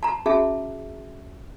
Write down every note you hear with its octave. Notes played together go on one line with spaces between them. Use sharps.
A5 A#5
C#4 F#4 G#4 E5 A5